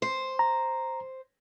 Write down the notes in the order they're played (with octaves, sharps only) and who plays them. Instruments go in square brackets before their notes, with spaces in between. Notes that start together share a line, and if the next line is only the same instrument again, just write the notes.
[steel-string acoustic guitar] C5
[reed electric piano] A#5